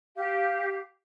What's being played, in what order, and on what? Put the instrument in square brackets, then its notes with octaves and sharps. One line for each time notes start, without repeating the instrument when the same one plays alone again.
[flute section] G4 F5